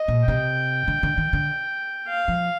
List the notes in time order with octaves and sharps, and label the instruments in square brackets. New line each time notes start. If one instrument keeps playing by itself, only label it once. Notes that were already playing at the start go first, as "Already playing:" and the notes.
Already playing: [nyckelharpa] D#5
[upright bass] A#2
[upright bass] C3 [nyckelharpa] G5
[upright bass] D3
D3
D#3
D3
[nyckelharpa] F5
[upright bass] F3